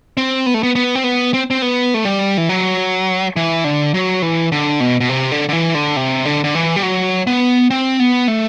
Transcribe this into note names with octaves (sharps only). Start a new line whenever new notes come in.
C4
B3
A3
B3
B3
C4
B3
C4
C4
B3
A3
G3
E3
F#3
E3
D3
F#3
E3
D3
B2
B2
C3
D3
D3
E3
D3
C3
D3
D3
E3
G3
F#3
B3
C4
B3
A3